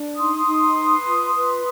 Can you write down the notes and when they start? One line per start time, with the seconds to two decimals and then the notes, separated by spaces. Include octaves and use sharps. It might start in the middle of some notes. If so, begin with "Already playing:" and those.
Already playing: D4
0.16 D#4 C6 D#6
0.46 D#4
0.75 B4
1.05 F4
1.35 B4